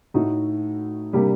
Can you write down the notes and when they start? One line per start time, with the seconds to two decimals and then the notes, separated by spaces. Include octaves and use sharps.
0.14 A2 A3 D#4 F#4
1.13 C3 G3 A#3 D4 G4